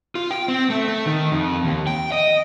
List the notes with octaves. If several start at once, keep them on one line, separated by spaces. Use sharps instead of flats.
F4
G5
C4
A3
A3
D#3
F2
D#2
G5
D#5